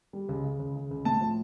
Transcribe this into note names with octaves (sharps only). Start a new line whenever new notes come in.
G3
C#2
C#3
C#2
C#3
C#2
A2 A5
F3